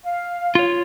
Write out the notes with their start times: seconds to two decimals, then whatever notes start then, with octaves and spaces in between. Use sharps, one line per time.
0.04 F5
0.55 F4 C#5